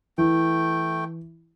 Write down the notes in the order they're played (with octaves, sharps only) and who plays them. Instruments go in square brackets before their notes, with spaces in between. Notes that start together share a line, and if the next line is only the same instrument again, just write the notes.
[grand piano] E3 [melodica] A3 G5